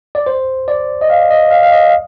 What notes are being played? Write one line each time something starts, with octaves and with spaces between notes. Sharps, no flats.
D5
C5
D5
D#5
F5
D#5
F5
F5
D#5
F5